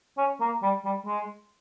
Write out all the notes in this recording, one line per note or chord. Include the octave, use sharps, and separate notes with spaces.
C#4
A#3
G3
G3
G#3